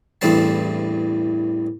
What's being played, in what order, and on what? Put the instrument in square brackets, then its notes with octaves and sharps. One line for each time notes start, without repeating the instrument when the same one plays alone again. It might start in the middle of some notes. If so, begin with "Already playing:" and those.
[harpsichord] A1 E2 G2 C4 A4 A5